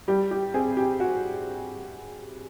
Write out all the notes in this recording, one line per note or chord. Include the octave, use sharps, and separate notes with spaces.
G3 G4
G4
C4 G#4
G4
F#4